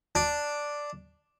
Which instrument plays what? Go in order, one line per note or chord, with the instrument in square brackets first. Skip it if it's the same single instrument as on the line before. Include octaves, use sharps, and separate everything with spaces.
[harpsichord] D4